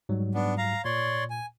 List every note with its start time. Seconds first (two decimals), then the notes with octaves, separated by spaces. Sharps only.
0.09 G#2 F#3 G3
0.34 B3 D4
0.58 F5 A#5
0.85 A#2 C#5 D5 C6
1.30 G#5